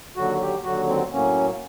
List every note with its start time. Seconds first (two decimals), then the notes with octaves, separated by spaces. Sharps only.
0.17 D#2 D3 F#3 F#4
0.41 G4
0.64 D#2 D3 F#3 F#4
0.88 C4
1.12 A2 F#3 A#3 C#4